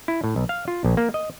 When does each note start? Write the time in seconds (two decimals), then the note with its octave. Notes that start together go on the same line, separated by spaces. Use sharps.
0.08 E4
0.24 A2
0.36 B1
0.49 F5
0.68 F4
0.84 A#1
0.97 A#3
1.14 D#5